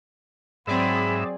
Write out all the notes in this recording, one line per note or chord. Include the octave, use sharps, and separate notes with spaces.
G#2 F#3 C4 G#4 D5 E5 B5